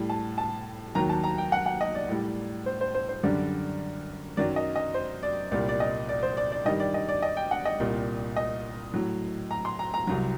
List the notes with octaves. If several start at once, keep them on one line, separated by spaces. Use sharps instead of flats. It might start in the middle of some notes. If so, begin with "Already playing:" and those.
Already playing: A2 G3
A5
A5
D#2 D#3 F#3 A#5
A5
A#5
G5
F#5
F#5
D#5
D5
A2 G3
C5
C5
C5
C5
F#2 D3 G3 D5
F#2 D#3 F#3 D5
D#5
D#5
C5
D5
C2 A#2 G3 D5
D5
D#5
D5
C5
D5
D5
G2 D#3 G3 D#5
D5
D#5
D5
D#5
G5
F#5
D#5
C2 A#2 G3
D#5
A2 F#3
A#5
C6
A#5
A#5
C2 C3 F#3